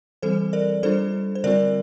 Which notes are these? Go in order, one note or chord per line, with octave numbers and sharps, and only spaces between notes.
E3 G3 C4 A4 C5
A#4 D5
G3 D4 F4 A4 C5
C5
D3 G3 C4 F4 A#4 D5